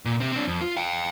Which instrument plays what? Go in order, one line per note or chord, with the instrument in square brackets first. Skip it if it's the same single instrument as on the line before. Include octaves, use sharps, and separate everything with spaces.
[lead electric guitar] A#2
C3 C4
C4 D4
F2
F4
F5 G5